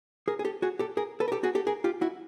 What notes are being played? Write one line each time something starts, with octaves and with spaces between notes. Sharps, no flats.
G#4 A#4
G#4
G4 A4
F#4 G#4
G4 A4
G#4 A#4
A4 B4
A#4
G4 A4
F#4 G#4
G4 A4
G#4 A#4
F4 G4
E4 F#4